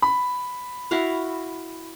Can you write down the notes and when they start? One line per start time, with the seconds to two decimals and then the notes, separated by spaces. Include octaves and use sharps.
0.02 B5
0.91 E4 F#4 F5